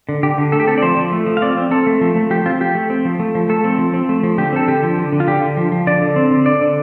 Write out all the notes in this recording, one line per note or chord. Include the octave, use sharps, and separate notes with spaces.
D3
D3 G4
D3
A3 A4
G4
C4 A4
D5
F3 C5
F3
A3
F3
F5
C4 D5
C4
C4 A4
A3
F3
A3
F3 G4
C4 F4
F3 G4
A3
C4
F3
A3
F3
A3 A4
C4
F3
C4
A3
F3
D3 G4
C4 A4
D3 G4
F3
D3
D3
F4
D3 G4
D3
F3
F3
D3 D5
D3
C4
D3
D3 D5
D3